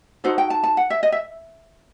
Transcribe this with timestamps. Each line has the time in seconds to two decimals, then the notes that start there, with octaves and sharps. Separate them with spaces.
0.24 D#4 F#4 A4 C5
0.38 G5
0.50 A5
0.63 A5
0.77 F#5
0.90 E5
1.03 D#5
1.12 E5